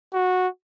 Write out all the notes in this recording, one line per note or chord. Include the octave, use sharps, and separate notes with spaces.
F#4